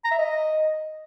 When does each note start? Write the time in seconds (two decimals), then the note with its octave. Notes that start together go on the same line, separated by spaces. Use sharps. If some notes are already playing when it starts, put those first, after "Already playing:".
0.04 A#5
0.11 E5
0.18 D#5